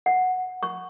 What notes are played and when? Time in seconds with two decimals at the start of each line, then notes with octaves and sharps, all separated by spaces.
0.06 F#5
0.63 C#6